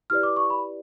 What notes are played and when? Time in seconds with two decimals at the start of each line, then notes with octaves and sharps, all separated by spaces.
0.10 E4 G4 B4 D5 F6
0.23 D6
0.36 C#6
0.50 B5